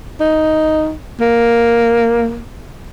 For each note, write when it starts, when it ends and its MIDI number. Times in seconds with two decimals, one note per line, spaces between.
0.20 0.93 63
1.20 2.39 58